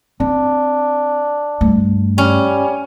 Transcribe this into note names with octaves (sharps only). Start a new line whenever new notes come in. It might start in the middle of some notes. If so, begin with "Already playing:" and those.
C4 D4
G2 A3
G3 C#4